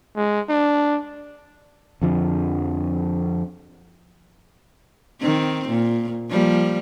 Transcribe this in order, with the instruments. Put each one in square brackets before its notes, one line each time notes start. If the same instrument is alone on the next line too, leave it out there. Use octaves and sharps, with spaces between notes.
[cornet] G#3
D4
[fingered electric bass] F2 D3 F3
[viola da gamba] D#3 C4
A#2
F3 G3 A#3